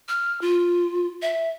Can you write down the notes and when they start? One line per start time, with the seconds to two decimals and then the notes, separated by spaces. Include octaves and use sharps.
0.09 F6
0.41 F4
1.22 E5